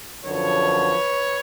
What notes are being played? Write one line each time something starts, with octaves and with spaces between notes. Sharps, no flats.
F#2 D3 F3 B4 C#5